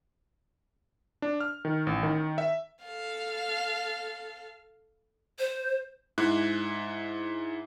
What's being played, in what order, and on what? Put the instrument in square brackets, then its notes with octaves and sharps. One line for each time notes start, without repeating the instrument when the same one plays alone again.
[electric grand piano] D4
F6
D#3
A1
D#3
E5
[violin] A4 F5
[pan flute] C5
[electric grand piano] G#2 E4 F#6